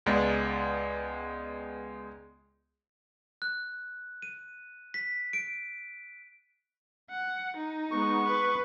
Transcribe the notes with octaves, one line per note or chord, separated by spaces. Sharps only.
C#2 G#3 B3 D5
F#6
D#7
B6
D7
F#5
D#4
G#3 B3 C#6
B4